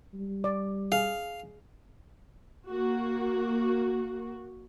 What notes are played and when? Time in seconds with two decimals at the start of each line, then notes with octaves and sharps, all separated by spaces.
0.14 G3
0.44 D5
0.92 G#4 F5
2.68 A#3 F#4